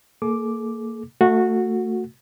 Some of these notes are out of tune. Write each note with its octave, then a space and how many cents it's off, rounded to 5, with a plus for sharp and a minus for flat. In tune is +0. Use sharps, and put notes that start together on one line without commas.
A#3 -25 G#4 +45 D6 +0
A3 +20 F#4 -15